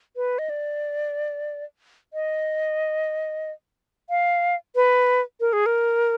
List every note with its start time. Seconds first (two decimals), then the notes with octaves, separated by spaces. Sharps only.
0.16 B4
0.39 D#5
0.50 D5
2.13 D#5
4.10 F5
4.75 B4
5.40 A#4
5.53 G#4
5.66 A#4